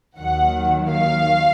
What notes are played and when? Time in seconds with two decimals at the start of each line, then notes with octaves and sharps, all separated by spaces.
0.18 D#2 D#3 F#3 F#5
0.90 F5